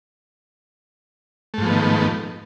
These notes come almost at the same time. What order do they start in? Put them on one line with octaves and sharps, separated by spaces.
A3 G#2 F3 B3 D#3